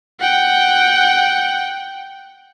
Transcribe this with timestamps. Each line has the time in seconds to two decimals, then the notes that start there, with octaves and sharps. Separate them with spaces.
0.20 F#5 G5